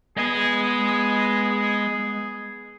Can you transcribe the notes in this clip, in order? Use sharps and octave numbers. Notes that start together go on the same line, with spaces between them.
G#3 B3 G#4 G#5